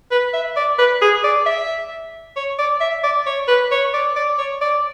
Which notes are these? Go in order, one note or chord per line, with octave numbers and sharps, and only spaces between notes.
B4
E5
D5
B4
G#4
D5
E5
C#5
D5
E5
D5
C#5
B4
C#5
D5
D5
C#5
D5